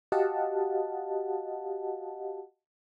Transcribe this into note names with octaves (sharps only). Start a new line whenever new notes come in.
F#4 G4 D#5 F5 F#5 A5